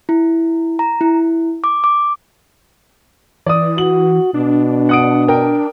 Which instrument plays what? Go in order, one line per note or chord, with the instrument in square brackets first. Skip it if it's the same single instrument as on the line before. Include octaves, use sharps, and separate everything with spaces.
[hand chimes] E4
A#5
E4
D6
D6
[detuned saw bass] E3 [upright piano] D5 D#6
[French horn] F#4 [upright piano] F#7
[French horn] B2 [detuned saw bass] D4
[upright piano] F#5 D#6 D7
A#4 G5